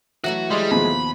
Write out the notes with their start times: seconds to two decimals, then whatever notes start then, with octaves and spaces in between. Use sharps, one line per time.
0.24 E3 F#3 A3 F#4
0.50 G3 G#3 C6
0.71 D#2 B2 F3 B5